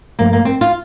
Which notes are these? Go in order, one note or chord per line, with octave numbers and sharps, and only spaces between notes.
G2 F3 A3 A#3
A#3
C4
F4